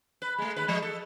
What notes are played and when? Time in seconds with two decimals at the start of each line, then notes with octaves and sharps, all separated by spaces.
0.22 B4
0.38 G#3 A3
0.56 D#2 B4
0.68 F3 G#3
0.82 A4